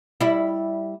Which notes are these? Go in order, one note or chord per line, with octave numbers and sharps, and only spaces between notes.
G3 E4